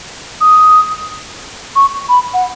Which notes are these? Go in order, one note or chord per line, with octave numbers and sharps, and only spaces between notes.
D#6
C#6
B5
F#5